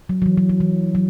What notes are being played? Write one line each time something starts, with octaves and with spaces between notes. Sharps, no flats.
F#3
F#3
E3
F#3
F#3
E3
F#3